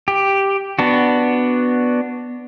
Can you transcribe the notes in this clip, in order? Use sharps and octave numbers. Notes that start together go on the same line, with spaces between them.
G4
B3 D4 F#4